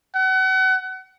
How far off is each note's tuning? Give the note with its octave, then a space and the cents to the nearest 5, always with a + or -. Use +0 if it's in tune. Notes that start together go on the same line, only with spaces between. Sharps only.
F#5 +35